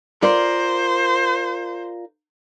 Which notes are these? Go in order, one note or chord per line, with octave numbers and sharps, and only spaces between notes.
F4 A#4 C5 D5